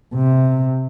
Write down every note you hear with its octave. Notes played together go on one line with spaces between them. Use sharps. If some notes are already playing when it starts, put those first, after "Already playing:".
C3